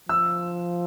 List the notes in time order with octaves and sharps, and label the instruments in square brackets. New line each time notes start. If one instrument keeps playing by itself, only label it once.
[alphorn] F3 [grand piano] E6